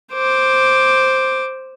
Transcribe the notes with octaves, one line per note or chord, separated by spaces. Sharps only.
C5 D6